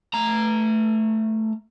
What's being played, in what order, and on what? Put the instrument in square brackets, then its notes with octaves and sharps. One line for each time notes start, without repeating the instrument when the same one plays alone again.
[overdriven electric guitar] A3 A#5